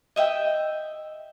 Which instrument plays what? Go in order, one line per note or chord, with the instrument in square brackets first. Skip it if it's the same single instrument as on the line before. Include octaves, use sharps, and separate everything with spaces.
[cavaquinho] D#5 E5 G5